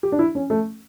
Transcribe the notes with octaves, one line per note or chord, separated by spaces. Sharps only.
G4
D4
E4
C#4
A3